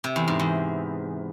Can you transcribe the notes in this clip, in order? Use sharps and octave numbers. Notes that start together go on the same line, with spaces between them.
C3
E2
G#2
E2